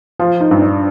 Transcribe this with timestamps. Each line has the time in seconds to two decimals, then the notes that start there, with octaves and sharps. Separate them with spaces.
0.19 F3 F4
0.40 D#4
0.51 G2
0.62 D4